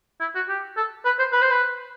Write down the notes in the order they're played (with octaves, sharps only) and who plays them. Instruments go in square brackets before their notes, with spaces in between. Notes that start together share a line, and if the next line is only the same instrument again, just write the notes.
[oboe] E4
F#4
G4
A4
B4
C5
B4
C5
B4